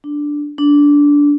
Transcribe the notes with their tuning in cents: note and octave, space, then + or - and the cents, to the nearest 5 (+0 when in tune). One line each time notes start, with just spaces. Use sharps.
D4 +0
D4 -15